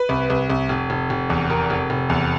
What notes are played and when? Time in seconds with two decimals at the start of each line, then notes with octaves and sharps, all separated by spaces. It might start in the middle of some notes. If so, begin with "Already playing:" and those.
Already playing: B4
0.09 C2
0.30 C2
0.50 C2
0.69 F1
0.90 F1
1.10 F1
1.30 E2
1.50 F1 A#4
1.70 F1
1.90 F1
2.10 E2